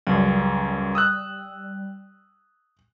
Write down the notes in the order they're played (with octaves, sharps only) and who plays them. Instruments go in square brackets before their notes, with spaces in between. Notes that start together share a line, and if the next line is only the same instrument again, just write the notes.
[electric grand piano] C#2 F#2 [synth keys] G3
[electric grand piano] D#6 E6 F#6